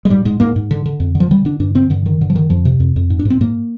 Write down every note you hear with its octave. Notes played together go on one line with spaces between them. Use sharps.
G#3
G#2 G3
G#2 G#3
G#2 A#3
G#2
D3
D3
F2
D3
F3
D3 G3
D3 D4
G2 D4
D3 C4
G2 D3
D3 D#3
G2 D3
F3
D3 D#3
F2 F3
C3
F2
F2
G#2
D4
G#2
C4
G#2 A#3